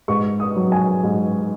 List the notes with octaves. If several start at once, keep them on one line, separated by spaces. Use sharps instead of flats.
G#2 C#6
D#6
F#3
G#5
G#2